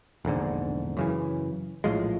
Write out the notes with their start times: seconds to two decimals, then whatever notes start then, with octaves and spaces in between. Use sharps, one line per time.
0.25 E1 A#1 G#2 D3
0.97 F#2 C#3 E3
1.84 A#1 A2 F3 G#3